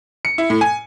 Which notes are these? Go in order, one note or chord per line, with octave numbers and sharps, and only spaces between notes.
C#7
E4
A2
G#5